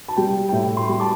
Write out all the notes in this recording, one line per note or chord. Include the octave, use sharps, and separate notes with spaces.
A5
G3 G5
G5
A2 E5
G5 C6
G3 C6
A5 D6